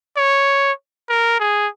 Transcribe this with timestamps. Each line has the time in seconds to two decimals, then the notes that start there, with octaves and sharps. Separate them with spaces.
0.17 C#5
1.09 A#4
1.39 G#4